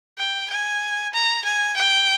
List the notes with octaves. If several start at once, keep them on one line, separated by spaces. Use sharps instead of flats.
G5
G#5
A#5
G#5
G5